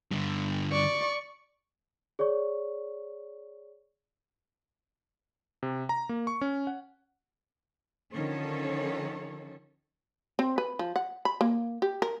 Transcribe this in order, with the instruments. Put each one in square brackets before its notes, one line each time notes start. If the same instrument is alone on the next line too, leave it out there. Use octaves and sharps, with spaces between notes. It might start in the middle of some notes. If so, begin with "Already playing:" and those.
[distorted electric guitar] G2 D3
[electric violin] D5 C#6
[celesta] G#4 C#5 D5 C#6
[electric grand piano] C3
A#5
A#3
C#6
C#4
F#5
[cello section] D3 D#3 F3 C#4 A4 C#5
[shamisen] C4
B4
F3
F#5
B5
A#3
G4
A#4